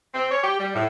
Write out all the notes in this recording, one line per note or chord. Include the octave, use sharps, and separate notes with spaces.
C4
C#5
G4
G3
A2